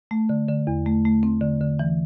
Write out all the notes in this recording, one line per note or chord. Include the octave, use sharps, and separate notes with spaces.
A3
D3
D3
E2
A3
A3
C4
D3
D3
E3